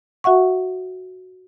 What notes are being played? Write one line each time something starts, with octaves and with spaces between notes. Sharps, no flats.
F#4 E5 F#5 C#6